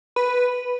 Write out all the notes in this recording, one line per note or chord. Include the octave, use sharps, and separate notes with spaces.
B4